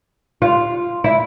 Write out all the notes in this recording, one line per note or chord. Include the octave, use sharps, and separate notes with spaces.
F4
E4